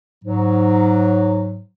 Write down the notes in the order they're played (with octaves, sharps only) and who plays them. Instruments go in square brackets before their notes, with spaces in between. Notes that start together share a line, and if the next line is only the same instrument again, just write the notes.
[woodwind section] G#2 F#3